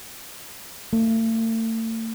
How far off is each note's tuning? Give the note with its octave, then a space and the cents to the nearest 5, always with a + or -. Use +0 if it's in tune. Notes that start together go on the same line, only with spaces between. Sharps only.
A3 +40